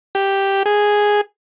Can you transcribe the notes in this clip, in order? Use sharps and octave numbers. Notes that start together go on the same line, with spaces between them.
G4
G#4